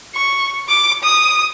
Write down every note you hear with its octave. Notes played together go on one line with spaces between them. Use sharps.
C#6
D6
D#6